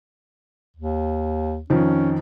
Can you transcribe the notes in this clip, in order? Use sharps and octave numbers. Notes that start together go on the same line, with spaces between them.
D#2
F2 D#3 F3 C#4